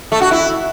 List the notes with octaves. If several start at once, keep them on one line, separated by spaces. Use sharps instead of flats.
A3
F#4
E4